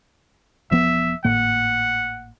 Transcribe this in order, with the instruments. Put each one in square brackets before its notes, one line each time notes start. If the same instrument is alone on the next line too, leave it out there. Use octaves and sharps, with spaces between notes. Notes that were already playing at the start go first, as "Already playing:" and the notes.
[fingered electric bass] E1 F3 B3 [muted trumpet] E5
[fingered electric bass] G#1 A2 A#3 [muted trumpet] F#5